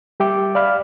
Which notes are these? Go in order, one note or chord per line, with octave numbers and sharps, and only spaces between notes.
G3 G4 E5 G5 D6
D5 F5 B5 F6